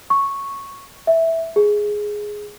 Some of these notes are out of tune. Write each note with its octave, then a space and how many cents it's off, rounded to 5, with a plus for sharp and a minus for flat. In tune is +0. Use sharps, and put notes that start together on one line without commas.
C#6 -5
E5 -10
G#4 +0